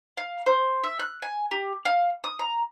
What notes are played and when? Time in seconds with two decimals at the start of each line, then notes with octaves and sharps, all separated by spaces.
0.17 F5
0.46 C5
0.84 E5
0.99 F#6
1.22 G#5
1.51 G4
1.85 F5
2.24 D#6
2.39 A#5